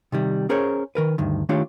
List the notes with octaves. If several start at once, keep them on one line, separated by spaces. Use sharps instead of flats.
C3 D#3 G3
C#4 G#4 A#4 C5 C#5
D#3 A#4 B4
D2 G2 D#3
D#3 A3 D4 F4 G4 C#5